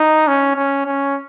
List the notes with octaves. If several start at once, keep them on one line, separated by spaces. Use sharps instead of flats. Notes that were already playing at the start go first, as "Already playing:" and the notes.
Already playing: D#4
C#4
C#4
C#4